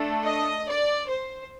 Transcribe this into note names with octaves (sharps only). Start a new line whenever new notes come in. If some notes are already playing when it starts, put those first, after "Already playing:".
Already playing: A3 D4 A4
D#5
D5
C5